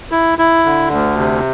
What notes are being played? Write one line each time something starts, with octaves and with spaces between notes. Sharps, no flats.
E4
E4
D3
D2
C3